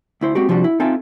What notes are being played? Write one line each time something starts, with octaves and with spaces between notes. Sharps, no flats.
D2 E4 C5
G#3 C4 F#4 G4
C3 F3 G3 D4 F#4
E4
C4 D#4 F4 A4 E5 G#5